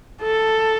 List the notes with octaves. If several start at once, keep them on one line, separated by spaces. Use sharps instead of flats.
A4